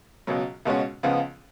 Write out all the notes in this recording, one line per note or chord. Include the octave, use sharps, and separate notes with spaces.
C#2 B2 F#3
C#2 B2 G#3 C#4 F#4
C#2 C#3 F3 B3